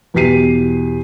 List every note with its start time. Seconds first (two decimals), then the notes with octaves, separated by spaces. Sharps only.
0.14 E2 B2 G4 B6 C7 D#7